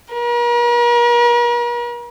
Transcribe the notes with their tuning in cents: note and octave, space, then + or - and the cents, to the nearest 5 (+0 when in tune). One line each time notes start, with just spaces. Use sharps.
A#4 +45